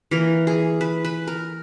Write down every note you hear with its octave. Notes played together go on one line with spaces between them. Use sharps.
E3 A#3 A#4
G#4
B4
B4
A#4